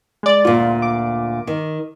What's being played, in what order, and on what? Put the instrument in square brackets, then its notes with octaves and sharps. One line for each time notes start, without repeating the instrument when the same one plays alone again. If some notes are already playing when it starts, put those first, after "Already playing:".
[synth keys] G#3 D5
[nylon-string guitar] D2 A#2 [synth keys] F4
[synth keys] D6
[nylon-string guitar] D#3